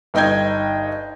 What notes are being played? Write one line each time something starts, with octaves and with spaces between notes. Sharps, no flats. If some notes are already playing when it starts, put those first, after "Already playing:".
G1 D#4 D#5 G5 G6 G#6